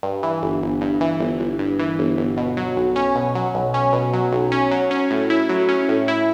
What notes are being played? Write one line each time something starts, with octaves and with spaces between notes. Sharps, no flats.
G2
E3
G1
G1
G2
E3
G1
G1
G2
E3
G1
G1
B2
F#3
B1
C#4
B2
F#3
B1
C#4
B2
F#3
B1
C#4
F#3
C#4
A2
E4
F#3
C#4
A2
E4